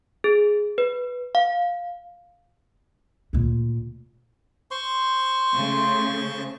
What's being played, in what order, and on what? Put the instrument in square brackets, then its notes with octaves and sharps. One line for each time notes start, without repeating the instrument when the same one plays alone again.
[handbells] G#4
B4
F5
[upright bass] D2 A#2
[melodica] C5 C6 C#6
[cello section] C#3 A3